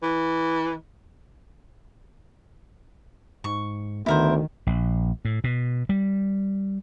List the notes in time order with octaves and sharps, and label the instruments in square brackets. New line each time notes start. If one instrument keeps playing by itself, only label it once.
[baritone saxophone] E3
[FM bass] G#2 [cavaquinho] C#6
[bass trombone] D2 [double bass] D#3 [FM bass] B3 [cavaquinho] E4 A#4 C5
[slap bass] A#1
A2
B2
G3